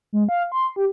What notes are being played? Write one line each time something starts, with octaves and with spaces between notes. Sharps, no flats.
G#3
F5
C6
G4